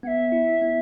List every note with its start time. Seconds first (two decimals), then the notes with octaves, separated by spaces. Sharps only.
0.03 B3 E5 F#5
0.32 E4
0.62 B3